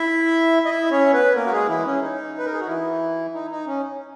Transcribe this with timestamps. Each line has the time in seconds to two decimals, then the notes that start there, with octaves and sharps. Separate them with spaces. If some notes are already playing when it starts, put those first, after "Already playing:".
Already playing: E4 E5
0.65 D#5
0.70 E4 E5
0.91 C#4 C#5
1.13 B3 B4
1.35 A#3 A#4
1.46 F#4
1.52 G#3 G#4
1.68 E3 E4
1.85 C#4
2.01 D#4
2.38 B4
2.46 A#4
2.53 G#4
2.60 F#4
2.67 E3 E4
3.34 D#4
3.51 D#4
3.67 C#4